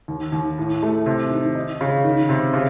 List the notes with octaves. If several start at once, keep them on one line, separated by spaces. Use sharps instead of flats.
D#2
D#2
A2
A3
C3
D#3
D#4
C#3
D#3
C3
C#3